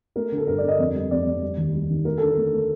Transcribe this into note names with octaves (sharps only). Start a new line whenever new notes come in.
A3 A#4
D3
A4
G2 A#4
D5
D3
D#5
F2
G3
F2 D5
F2
G3
D#2
G3
D#3
A3 A#4
D3 A4
A#4
A3
A3